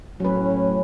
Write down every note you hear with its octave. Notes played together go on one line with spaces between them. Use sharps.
A2 F#3 C#4 B4